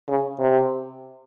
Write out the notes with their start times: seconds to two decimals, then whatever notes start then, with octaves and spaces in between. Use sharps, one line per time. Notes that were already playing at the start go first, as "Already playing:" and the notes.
0.09 C#3
0.39 C3